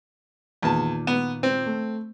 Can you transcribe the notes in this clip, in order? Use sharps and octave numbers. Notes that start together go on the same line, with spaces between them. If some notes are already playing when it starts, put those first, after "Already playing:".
E2 A#2 D#3 A5
B3
C4
A3